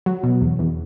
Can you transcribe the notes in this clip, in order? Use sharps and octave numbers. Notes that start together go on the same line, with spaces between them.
F#3
B2
E2
E2